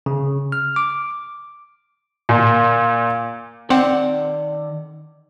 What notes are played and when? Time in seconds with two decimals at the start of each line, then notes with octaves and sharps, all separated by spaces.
0.06 C#3
0.52 F6
0.76 D6
2.29 A#2
3.70 D#3 C4 D5 F#5